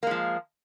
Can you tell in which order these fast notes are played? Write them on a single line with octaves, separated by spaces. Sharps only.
A#3 G#3 F3